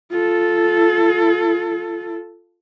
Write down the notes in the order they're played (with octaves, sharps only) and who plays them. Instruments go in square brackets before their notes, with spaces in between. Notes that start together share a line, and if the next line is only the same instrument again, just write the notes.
[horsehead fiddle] F4 A4